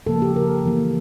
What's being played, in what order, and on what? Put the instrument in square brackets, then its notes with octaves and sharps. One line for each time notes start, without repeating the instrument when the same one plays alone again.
[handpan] C#3 F3 A#3 A4
G4
A#4
E3 A#3